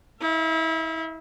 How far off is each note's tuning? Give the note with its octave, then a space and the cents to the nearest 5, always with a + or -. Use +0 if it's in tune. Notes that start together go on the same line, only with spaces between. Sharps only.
E4 -35 E5 +40